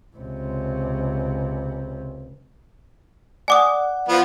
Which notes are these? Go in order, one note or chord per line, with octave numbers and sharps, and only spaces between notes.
C#2 C3
D5 F#5 G#5 D6 D#6
F3 B3